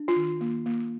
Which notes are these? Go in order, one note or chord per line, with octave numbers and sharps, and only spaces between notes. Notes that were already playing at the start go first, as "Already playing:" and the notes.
Already playing: D4
F4
D#3
A#3
A#3